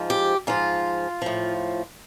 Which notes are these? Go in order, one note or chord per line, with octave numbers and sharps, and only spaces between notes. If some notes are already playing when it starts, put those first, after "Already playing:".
Already playing: G#2 F3
G4
G#2 F3 F4
A2 F3